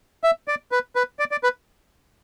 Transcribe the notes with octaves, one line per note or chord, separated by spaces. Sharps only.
E5
D5
B4
B4
D5
D5
B4